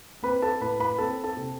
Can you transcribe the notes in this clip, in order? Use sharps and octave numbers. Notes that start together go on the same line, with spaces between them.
C4 B4 B5
A4 A5
A2 B4 B5
B4 B5
C4 A4 A5
A4 A5
C3